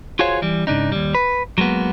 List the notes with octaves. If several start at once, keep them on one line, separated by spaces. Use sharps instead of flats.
F4 F#4 G#4 C5 C#5 F5
E3 G3
G#2 C#3 D4 D#4
D#2 G3
B4
F#3 G#3 A#3 B3